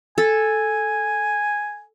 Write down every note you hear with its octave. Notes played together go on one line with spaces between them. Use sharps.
A4 G#5